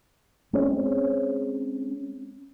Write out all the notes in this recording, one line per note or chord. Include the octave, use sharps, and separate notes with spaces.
G#3 C4 C#4